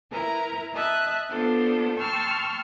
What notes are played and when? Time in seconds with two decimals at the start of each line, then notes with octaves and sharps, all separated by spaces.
0.10 E4 A#4 B4 A#5
0.73 D#5 E5 A5 F#6
1.29 B3 D4 F4 A4 C5
1.97 G5 A5 C6 C#6 E6 F6